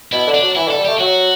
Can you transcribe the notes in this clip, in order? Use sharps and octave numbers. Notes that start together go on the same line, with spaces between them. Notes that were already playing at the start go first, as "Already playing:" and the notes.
B2 E4
D3
D4
F#3
E3 E4
D3
A4
G3
A3 G4
F#3 F#4